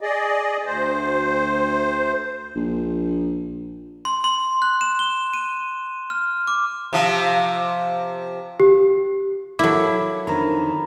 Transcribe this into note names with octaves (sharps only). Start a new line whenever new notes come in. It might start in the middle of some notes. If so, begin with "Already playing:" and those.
G#4 D5 D#5
D2 C5
A#1
C6
C6
F#6
E7
G7
D#7
F6
D6
C3 F3
G4
F#3 A#3 E4 A4 D6
F2 D3 D#3 A#5 B5